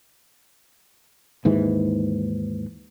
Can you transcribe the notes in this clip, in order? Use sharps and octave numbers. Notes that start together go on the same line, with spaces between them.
D#2 G#2 E3